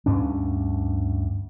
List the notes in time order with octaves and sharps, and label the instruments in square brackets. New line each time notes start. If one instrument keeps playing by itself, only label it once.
[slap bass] D2 G2 C#4 D4